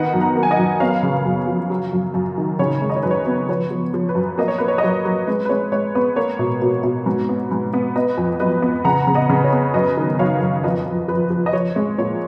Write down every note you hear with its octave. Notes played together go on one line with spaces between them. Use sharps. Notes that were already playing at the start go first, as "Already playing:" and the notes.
Already playing: D#3 B3 D#5 F#5
F#2
F#5 A#5
A#3
G#5
D#5 F#5
F#2
B3 C#5 F5
C#3
F#2
F3
F#3
F#2
F#2
D#3
C#3 C#5
G#3
D#5
C#5
F#2 B4
C#5
B3
F3 C#5
F3
F3
B4
F#2
A#3 D#5
C#5
A#3 B4
C#5
D#5
F#3 C#5
F#3
G#3 B4
B4
G#3 C#5
G#3 C#5
B3 B4
A#3 C#5
B2
B2
B2
G#2
B3
G#2
B3
B3 B4 D#5
F2
F#3 B4 D#5
B3
C#3 F#5 A#5
C#3
D#5 F#5
C#3
B4
C#5
B3
F#2 B4 D#5
D#3
F#2 C#5 F5
F#2
F2 B4 D#5
F2
F3 B4
F3
D#5
F3 C#5
G#3
A#2 C#5